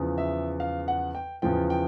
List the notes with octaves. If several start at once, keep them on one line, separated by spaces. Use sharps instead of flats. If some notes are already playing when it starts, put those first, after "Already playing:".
Already playing: E2 C#3 F3
E5
F5
F#5
G5
E2 C#3 F3 G5
G5